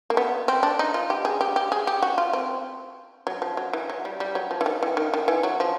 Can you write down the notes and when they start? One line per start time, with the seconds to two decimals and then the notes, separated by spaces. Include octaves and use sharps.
0.10 A#3
0.17 B3
0.48 C4
0.63 D4
0.79 D#4
0.94 F4
1.10 G4
1.25 G#4
1.41 G4
1.56 G4
1.72 G#4
1.87 G4
2.02 F#4
2.18 F4
2.33 C4
3.27 F#3
3.42 F3
3.57 F#3
3.73 E3
3.89 F#3
4.05 G3
4.20 G3
4.35 F#3
4.51 F3
4.61 E3
4.66 D#3
4.83 E3
4.97 D#3
5.14 D#3
5.28 E3
5.43 F#3
5.60 F3